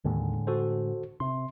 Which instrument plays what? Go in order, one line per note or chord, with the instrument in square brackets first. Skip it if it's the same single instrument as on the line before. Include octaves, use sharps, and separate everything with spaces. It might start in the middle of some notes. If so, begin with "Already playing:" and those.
[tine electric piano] D#2 [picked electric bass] A2 D3 G#3
[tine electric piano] F#4 A4 C5
[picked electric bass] C3 [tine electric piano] C6